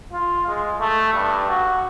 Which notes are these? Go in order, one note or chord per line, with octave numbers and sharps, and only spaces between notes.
F4
G#3
A3
G2
F#4